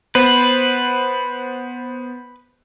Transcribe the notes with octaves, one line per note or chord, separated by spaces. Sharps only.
B3 B4 C5